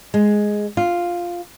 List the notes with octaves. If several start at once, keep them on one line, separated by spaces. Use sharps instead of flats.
G#3
F4